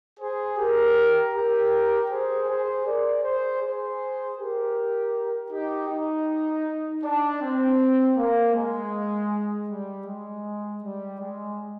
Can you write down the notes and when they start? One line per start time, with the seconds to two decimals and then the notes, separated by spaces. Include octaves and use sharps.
0.20 G#4 C5
0.58 G4 A#4
1.34 G4 A#4
2.10 G#4 C5
2.48 G#4 C5
2.86 A#4 D5
3.23 G#4 C5
3.61 G#4 C5
4.37 G4 A#4
5.51 D#4 G4
5.89 D#4
7.04 D4
7.41 C4
8.17 A#3
8.55 G#3
9.68 G3
10.07 G#3
10.83 G3
11.20 G#3